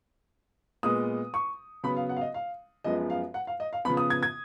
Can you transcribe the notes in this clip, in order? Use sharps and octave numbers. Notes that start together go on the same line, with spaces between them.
A#2 G#3 B3 D#6
C#6
C#3 F#3 B3 B5
F5
F#5
F5
D#5
F5
F#2 F3 G#3 B3 D#5
F5
F#5
F5
D#5
F5
C#3 F3 B3 B5
D#6
G#6
G#6